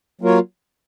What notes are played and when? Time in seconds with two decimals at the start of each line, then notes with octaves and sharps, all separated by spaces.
0.21 F#3 A#3 F4 A#4 C#5